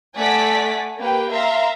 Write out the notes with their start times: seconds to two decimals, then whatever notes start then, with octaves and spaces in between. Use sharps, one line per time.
0.15 A3 D5 F#5 G#5 B6
0.97 A#3 G4 B4 G5
1.30 E5 F5 A#5 C6